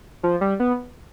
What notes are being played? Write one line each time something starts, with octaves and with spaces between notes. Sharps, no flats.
F3
G3
B3